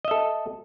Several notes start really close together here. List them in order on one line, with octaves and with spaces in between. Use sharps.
D#5 E5 A4